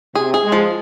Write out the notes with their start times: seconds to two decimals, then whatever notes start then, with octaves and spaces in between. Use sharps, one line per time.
0.15 C3 G#4
0.34 G#4
0.44 G#3
0.52 F3